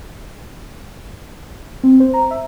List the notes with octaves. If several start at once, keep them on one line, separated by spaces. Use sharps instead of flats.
C4
C5
A#5
E5